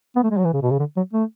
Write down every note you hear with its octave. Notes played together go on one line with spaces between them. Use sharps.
B3
A3
G#3
F#3
E3
C#3
B2
C#3
D3
F#3
A3